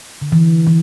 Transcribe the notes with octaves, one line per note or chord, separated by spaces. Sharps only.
D3
E3
E3